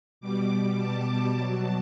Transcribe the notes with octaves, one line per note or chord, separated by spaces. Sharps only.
B2 G3 D6
A5
B2 F#3